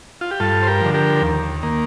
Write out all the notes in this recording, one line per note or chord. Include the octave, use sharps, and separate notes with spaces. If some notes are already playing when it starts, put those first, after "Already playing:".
F4
G4
G2 F4 A4
C5
G4 A#4
D3 F3
G4 A#4
D#2
D#3 A#3